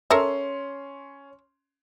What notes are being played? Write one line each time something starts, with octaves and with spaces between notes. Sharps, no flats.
C#4 A4 A#4 E5 C6